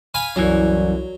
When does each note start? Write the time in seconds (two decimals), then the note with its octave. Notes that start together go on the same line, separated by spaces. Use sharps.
0.14 F5 G#5 B5
0.36 C2 F#2 E3 F#3